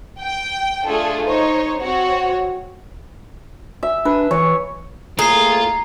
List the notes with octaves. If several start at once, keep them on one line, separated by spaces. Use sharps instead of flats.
G5
A3 D4 F4 G#4 A4
D#4 C5 C#5
C4 F#4 C#5
E5
D4 B4
E3 C#5
A2 A#3 F4 G#4 A#5 C7